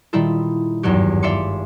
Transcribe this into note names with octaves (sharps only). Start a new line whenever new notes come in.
A#2 D#3 G3 E4 F4 A4
G#1 E2 G2 F#3 F#4 G4
D5 E5 F5 C6 D6 C#7